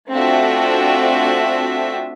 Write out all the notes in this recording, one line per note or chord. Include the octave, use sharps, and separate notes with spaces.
A3 C4 D4 F4 F#4 E5